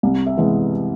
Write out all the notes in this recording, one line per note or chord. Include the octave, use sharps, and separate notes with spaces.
C2
E5
C3 E3 G#3 B3